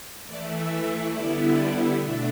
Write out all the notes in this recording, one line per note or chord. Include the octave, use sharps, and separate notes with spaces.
E3 A3 E4 D5
E5
D3 G3 B3 E4 D5
D5
B2 A3 D4 E5